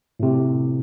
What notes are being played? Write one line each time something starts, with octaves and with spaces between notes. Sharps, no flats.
A2 C3